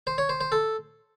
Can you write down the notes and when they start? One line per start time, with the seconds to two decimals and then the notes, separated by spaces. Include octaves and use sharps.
0.07 C5
0.18 C#5
0.29 C5
0.41 C5
0.52 A4